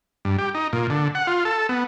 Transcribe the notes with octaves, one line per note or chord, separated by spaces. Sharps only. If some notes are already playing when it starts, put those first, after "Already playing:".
G2
G4
D#4
A#2
D3
F#5
F4
A4
B3